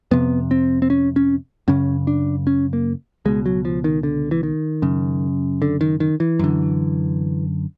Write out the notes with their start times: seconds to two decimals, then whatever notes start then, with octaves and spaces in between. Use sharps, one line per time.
0.11 F2 C3 B3
0.51 C4
0.82 C4
0.90 C#4
1.16 C#4
1.68 F#2 C#3 C#4
2.07 D4
2.47 C#4
2.73 A#3
3.25 C#2 B2 G#3
3.46 F#3
3.65 F3
3.84 D#3
4.03 D3
4.31 E3
4.43 D#3
4.82 F#2 C#3
5.62 D3
5.81 D#3
6.00 D#3
6.20 E3
6.39 F#2 D3